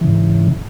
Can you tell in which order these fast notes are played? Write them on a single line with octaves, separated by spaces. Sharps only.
E3 C#3 G#2